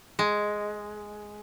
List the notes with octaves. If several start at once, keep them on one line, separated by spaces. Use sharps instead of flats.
G#3